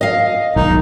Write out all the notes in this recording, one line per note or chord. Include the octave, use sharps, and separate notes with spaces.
D#5 F5
B1 G#2 D#3 D#4